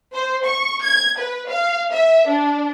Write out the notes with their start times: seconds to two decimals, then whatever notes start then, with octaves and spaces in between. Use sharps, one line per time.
0.14 C5
0.45 C#6
0.83 G#6
1.19 B4
1.49 F5
1.92 E5
2.28 D4